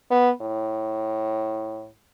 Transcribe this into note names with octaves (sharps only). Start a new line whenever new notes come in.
B3
A2